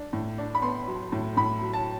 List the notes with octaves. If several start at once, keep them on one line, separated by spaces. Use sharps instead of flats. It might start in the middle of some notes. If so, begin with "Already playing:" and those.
Already playing: D4
A2
D4
B5
B3 C6
F#3
A2
A2 B5
F#3
A5